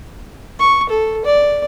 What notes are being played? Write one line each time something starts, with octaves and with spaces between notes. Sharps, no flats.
C#6
A4
D5